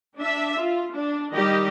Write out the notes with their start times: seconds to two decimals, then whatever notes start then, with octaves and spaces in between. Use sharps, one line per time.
0.18 D4 E5
0.59 F4
0.96 D4
1.33 D#3 G3 G4 D#5